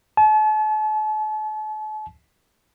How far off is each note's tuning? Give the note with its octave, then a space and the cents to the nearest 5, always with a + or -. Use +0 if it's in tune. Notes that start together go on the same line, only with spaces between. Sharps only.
A5 -40